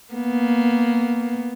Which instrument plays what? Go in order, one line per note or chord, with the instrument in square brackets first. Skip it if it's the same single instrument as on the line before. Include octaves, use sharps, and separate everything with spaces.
[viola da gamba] A#3 B3